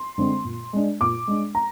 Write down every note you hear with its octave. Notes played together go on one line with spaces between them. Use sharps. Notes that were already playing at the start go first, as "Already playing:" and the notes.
Already playing: C6
D3 G#3 C4
A#2
G#3 D4
A#2 D6
G#3 D4
A#5